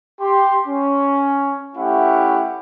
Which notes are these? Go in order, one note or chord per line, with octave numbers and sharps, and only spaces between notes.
G4 C6
C#4
A3 C#4 E4 G4 F#5